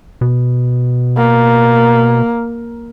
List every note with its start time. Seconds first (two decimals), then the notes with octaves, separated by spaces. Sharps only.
0.21 B2
1.18 A#3